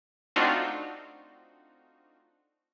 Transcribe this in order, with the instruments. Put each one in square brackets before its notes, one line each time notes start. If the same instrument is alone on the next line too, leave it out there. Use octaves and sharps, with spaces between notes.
[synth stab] A3 C4 D4 D#4 F4 F#4